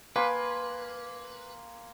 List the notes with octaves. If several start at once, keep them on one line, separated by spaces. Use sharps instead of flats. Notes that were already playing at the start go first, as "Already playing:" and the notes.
A#3 B4 G#5 C6